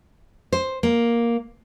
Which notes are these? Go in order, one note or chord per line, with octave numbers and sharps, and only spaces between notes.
C5
A#3